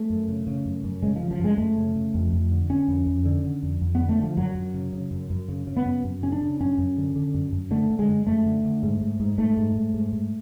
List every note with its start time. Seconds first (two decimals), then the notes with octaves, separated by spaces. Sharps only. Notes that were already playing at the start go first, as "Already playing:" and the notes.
Already playing: A3
0.10 F#2
0.28 C#3
0.47 C#3
0.65 F#2
0.84 F#2
1.02 C#3 G#3
1.16 F3
1.21 C#3
1.31 F3
1.39 F#2 G#3
1.58 F#2 A3
1.77 C#3
1.95 C#3
2.14 F2
2.33 F2
2.51 D3
2.70 D3 C#4
2.88 F2
3.07 F2
3.25 D3
3.44 D3
3.63 F2
3.81 F2
3.95 B3
4.00 D3
4.09 A3
4.18 D3 F3
4.37 F#2 F#3
4.55 F#2
4.74 C#3
4.93 C#3
5.11 F#2
5.30 F#2
5.48 C#3
5.67 C#3
5.77 B3
5.85 F#2
6.04 F#2
6.22 C#3 C#4
6.32 D4
6.41 C#3
6.60 F#2 C#4
6.78 F#2
6.97 D3
7.16 D3
7.34 F#2
7.52 F#2
7.71 D3 A3
7.90 D3
7.99 G#3
8.08 F#2
8.27 F#2 A3
8.46 D3
8.64 D3
8.83 G#2
9.01 G#2
9.20 G#2
9.38 G#2 A3
9.57 G#2
9.76 G#2
9.94 G#2
10.12 G#2